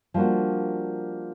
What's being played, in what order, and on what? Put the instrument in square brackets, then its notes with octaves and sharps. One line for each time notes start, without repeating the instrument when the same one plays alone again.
[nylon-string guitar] F3 G3 A#3 D4 F#4